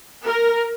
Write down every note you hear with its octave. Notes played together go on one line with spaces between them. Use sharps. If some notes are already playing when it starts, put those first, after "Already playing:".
A#4